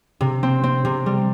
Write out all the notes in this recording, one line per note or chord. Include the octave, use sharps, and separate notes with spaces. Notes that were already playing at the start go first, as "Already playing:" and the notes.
C3
C4
C4
C3
G3